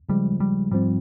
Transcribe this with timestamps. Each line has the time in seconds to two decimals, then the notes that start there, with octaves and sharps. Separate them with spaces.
0.09 C#3 F3 G3 G#3
0.40 G3
0.71 G#2 F3 G3 C4